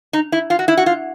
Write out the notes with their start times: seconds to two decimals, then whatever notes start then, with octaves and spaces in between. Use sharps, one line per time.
0.13 D#4
0.32 E4
0.50 F4
0.59 F#4
0.68 E4
0.77 F#4
0.86 F4